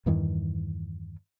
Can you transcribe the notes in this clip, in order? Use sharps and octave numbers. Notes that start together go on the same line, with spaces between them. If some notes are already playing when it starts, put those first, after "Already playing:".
E2 G2 D#3 E3